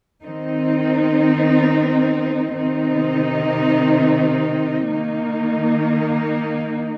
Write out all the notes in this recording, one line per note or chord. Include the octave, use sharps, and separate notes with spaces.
D#3 C4 D#4
C3 D#3 C4 D#4
D#3 A#3 D#4